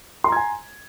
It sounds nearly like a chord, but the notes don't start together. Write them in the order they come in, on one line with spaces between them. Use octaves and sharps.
C6 A#5 G#6 G#5